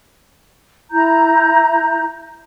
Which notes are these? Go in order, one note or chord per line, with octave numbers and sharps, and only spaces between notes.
E4 A#5 G6